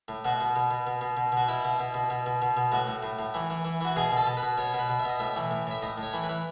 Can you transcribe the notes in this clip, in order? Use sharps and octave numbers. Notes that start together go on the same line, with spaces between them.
A2
B2 F#4
B2
B2
B2
B2
B2
B2
B2 F#4
B2 E4
B2
B2
B2
B2
B2
B2
B2
A2 F#4
A2
A2
A2
E3
E3
E3
E3 F#4
B2 G#4
B2
A4
B2
B4
B2
B2 C#5
B2
B4
B2
E5
B2 D#5
A2 E5
E3
A2
A2 E5
A2 D#5
A2 C#5
E3
B4
E3